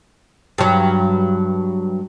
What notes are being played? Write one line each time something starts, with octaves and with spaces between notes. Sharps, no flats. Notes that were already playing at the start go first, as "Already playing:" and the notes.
G2 F#3